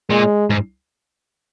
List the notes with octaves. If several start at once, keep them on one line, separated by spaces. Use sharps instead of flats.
A#2 G#3
G#2